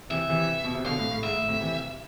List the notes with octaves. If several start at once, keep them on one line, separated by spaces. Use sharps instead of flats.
C3 E3 E5
C3 E3
B2
C3
B2 D3 F5
A2 C3
A2
G#2 E5
A2
A2 C3
C3 E3